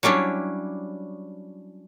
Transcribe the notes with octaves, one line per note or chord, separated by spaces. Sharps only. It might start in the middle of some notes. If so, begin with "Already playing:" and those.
F#3 G3 C#4 D4 E4